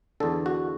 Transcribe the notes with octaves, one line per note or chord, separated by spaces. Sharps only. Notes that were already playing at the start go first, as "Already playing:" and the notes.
E2 D3 A4
F#4